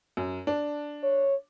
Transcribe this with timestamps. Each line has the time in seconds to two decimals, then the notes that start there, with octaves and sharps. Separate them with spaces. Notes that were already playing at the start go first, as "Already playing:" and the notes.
0.17 F#2
0.47 D4
1.03 C#5